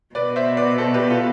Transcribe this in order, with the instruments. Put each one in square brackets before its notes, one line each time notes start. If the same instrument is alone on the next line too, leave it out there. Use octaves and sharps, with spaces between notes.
[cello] B2 [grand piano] B4 D5
[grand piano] C5 E5
B4 D5
A4 C5
G4 B4
F4 A4